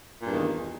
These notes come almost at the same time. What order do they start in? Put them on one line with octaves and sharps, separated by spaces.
A#2 G2 E2 D#3